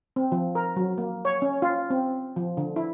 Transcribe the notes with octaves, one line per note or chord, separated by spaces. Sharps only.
C4
F3
A#4
F#3
A#3
C#5
C#4
F4
C4
F3
D3
E4